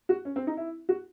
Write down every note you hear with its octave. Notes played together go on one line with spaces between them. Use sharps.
F#4
C#4
C4
D#4
E4
F#4